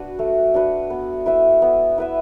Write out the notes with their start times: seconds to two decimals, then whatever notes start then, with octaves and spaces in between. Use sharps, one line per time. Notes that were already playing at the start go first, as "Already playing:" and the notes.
Already playing: D4 F#4 B4
0.19 A3
0.54 D4 F#4 B4
0.90 B3
1.26 E4 B4 E5
1.62 B3
1.98 E4 B4 E5